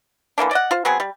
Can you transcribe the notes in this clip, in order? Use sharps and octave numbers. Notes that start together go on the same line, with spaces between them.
D3 E3 A#3 D4
D5 D#5 F#5
F4 C5
F#3 B3 C4 G#4
G3